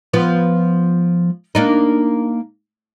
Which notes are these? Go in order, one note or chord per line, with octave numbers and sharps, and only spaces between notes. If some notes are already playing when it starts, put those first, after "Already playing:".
F3 B3 F4
A#3 D4 D#4